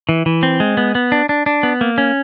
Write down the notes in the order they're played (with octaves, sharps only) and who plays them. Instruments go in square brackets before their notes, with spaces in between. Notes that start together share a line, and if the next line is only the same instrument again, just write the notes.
[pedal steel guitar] E3
E3
C4
G#3
B3
B3
D4
D4
D4
B3
A#3
C#4